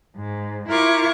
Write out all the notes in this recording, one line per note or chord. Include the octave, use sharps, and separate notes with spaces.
G#2
E4 F4 A#4 C#6 D6